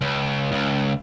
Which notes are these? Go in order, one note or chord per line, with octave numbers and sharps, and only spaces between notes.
C#2
C#2